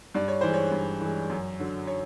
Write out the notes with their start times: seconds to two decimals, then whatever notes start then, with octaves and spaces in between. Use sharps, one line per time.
0.15 G2 D5
0.28 C#5
0.41 E3 C5
0.48 G#3
0.54 C#5
0.72 G2
1.00 E3 G#3
1.29 F#2
1.59 D3 F#3
1.87 C#5